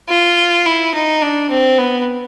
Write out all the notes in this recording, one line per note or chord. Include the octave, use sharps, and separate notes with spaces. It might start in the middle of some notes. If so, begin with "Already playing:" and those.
F4
E4
D#4
D4
C4
B3